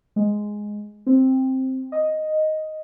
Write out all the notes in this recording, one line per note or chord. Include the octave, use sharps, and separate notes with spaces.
G#3
C4
D#5